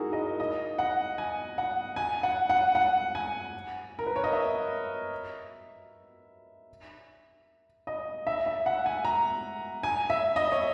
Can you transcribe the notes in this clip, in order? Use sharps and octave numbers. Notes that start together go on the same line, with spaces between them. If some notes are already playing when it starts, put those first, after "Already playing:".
Already playing: D#4 E4 F#4 G#4 A#4
D#5
D#5
F#5
G#5
F#5
G#5
F#5
F#5
F#5
G#5
A#4
B4
C#5
D#5
E5
D#5
E5
E5
F#5
G#5
A#5
G#5
E5
D#5
C#5